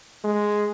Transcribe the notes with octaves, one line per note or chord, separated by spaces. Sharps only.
G#3